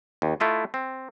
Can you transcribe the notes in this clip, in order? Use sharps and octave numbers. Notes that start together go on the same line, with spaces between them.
D#2
A3 E4 F4 D#5
C4